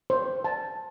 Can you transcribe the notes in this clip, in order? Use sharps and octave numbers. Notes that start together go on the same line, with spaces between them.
C5
A5